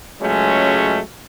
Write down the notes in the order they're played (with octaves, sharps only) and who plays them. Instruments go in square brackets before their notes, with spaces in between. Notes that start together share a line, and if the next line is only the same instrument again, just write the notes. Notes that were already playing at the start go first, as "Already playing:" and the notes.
[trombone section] C#2 F#3 G#3 A3 C#4